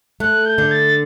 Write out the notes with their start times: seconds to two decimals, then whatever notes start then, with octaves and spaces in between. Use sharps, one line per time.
0.20 A3 F#6
0.46 G6
0.58 D3
0.71 A6